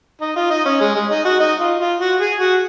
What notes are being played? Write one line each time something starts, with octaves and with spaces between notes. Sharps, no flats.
D#4
F4
D#4
C#4
G#3
G#3
D#4
F#4
D#4
F4
F4
F#4
G#4
F#4